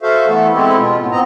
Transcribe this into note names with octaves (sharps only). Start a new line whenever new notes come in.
F#4 A4 C5 E5 F5
E3 A3 B3 A4
G#3 C4 E4 G4 A4
B2 F4
A2 B3
G#2 B3 C4 D#5 A#5